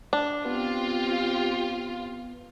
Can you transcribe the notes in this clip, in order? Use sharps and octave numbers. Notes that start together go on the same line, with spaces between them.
D4
B3 C4 F4 G4 B4